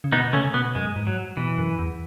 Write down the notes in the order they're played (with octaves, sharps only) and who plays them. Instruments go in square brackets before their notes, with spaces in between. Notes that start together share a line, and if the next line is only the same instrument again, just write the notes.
[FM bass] C#3
[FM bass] B2 [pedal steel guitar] B3 D#4
[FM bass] C#3 [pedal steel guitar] A3 C#4
[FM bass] B2 [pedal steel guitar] B3
[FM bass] F#2 [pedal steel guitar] G#3
[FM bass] G#2
[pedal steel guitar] F#3
[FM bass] B2 [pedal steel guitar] E3
[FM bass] F#2
E2